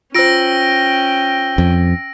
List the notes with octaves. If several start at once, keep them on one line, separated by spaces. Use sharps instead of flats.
C#4 F4 C5 G5 E6 A#6 D7
F2